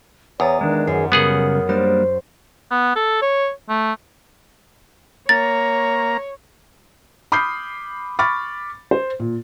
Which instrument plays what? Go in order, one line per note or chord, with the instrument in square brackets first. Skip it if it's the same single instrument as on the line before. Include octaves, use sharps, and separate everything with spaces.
[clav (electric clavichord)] E2 [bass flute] C#5 [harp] A#5 D#6 A6
[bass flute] D#3 [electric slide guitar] G#3 D4
[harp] F#2 [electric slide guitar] G#4
[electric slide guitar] C#3 G3 [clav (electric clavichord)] B3 G#4 F#5 [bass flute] A#4
[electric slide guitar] G3 A#3 D4 [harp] C5
[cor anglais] B3
A4
C#5
A3
[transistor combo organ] A#3 A#5 [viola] C#5 [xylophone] A6
[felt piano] B5 D6 D#6 F6 G6 C7
B5 C#6 D6 F6 A6
C5
A#2